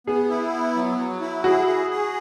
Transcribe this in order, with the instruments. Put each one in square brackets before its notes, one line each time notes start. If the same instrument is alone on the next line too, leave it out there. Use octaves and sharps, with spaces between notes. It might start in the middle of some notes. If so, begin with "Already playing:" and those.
[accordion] B3 [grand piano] G#4
[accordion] E4
B3
F#3
F#3
E4
[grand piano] F#4 [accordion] G#4
[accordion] G#4
G#4